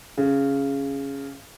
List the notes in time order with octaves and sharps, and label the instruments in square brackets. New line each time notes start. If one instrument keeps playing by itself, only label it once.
[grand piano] C#3